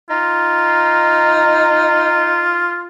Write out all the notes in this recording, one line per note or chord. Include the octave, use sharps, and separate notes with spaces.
D#4 F4